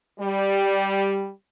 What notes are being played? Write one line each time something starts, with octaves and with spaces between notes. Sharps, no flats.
G3